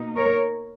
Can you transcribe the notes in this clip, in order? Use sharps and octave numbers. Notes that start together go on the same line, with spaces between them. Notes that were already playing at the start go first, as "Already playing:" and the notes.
Already playing: B2 A#3 D#4
A#4 C#5